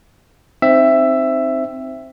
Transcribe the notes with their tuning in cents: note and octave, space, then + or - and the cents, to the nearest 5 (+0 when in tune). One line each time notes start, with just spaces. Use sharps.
C4 +0 D#4 -5 E5 +10